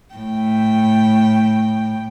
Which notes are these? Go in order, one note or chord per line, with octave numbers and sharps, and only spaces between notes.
A2 G5